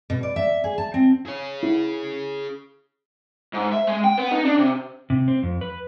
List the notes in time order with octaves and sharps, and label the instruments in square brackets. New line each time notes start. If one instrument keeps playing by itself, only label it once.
[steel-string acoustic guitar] B2
D5
E5
G#4
A5
C4
[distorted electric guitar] G#4 C#5
[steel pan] E4
[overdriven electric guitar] G#2
E5
G#3
G5
B3
D#4
D4
C3
[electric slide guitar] C3
C4
F2
B4